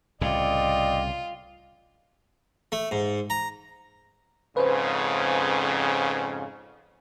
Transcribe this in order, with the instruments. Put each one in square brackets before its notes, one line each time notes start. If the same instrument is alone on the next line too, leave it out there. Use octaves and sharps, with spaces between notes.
[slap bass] C2 A2 C#3 [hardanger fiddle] F4 [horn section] D5 D#5 G5
[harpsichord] A3
G#2
A#5
[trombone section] F2 G#2 C#3 [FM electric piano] B4 C5